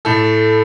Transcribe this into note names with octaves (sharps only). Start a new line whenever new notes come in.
A2 A4